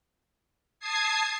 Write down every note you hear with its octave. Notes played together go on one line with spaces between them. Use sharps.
A5 D#6 G#6 C7